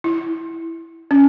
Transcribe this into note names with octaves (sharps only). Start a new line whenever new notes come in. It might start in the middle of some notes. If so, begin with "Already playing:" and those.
E4
C#4